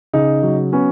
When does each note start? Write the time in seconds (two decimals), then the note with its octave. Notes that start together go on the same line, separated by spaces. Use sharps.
0.13 C#3 D#4
0.43 F#3
0.73 B3 C#4